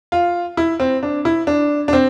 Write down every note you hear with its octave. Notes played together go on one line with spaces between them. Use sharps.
F4
E4
C4
D4
E4
D4
D4
C4